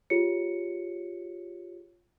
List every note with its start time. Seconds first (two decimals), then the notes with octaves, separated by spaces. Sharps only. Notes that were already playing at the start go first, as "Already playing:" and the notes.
0.10 F4 G4 G#4 C#5 C#7